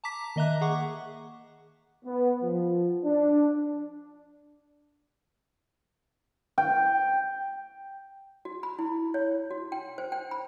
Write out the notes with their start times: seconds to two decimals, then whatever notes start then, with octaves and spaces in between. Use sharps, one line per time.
0.04 A5 A#5 D6 B6
0.36 D#3 A#3 D#5 E5 A#5 F#6
0.61 G#4 F#5 C#6 D6
2.05 B3
2.42 F3
3.05 D4
6.58 G5
8.45 F#4
8.63 B5
8.79 E4
9.14 C#5
9.51 F#4
9.72 G5
9.98 C5
10.12 G5
10.31 B5